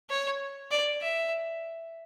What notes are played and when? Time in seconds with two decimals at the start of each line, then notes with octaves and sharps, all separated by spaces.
0.09 C#5
0.71 D5
1.02 E5